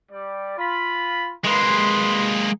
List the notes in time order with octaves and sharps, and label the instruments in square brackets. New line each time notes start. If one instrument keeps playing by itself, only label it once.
[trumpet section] G3 D5
F4 B5
[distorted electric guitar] G#3 A#3 [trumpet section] B4 C6